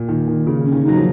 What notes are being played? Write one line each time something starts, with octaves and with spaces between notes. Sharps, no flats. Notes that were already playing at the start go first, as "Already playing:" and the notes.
Already playing: A#2
D#3
D#3
C#3
C#4
D#3
F#3 D#4
F3